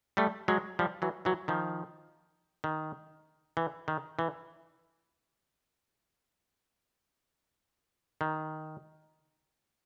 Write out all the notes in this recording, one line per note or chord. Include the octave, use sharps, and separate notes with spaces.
G3 A3
F#3 G#3
F3 G3
E3 F#3
E3 F#3
D#3 F3
D#3
E3
D#3
E3
D#3